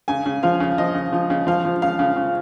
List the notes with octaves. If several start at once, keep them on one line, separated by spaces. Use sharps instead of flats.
C#3 G#5
C#3
F3 F5
C#3
F3 D#5
C#3
F3
C#3
F3 F5
F3
C#3 F5
C#3
C#3